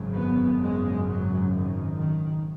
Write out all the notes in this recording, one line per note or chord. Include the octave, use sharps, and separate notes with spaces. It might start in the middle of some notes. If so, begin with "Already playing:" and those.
Already playing: G#1 F#2 C#3
B3
G#3
F#3
D#3
D#3